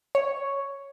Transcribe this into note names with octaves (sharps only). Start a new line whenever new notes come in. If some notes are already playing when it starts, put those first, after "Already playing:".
C#5